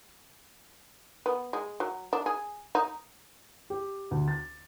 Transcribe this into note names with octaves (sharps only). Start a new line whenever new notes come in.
B3
G#3
F#3
D4
G#4
D#4
G4
D2
A6